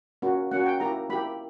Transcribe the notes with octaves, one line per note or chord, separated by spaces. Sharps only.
A#3 C#4 F#4
A#3 C#4 F#4 F#5
G5
A#3 E4 G4 A#5
A#3 E4 G4 B5